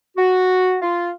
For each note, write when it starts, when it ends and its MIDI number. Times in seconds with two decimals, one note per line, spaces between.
0.17 0.76 66
0.82 1.11 65